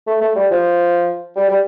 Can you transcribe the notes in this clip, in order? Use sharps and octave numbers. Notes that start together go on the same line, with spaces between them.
A3
A3
G3
F3
G3
G3